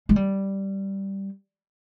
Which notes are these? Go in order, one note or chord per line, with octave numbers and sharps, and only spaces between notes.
G#3
G3